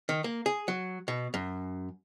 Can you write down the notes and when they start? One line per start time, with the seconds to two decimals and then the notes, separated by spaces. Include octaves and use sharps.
0.09 D#3
0.24 A#3
0.46 G#4
0.68 F#3
1.08 B2
1.34 F#2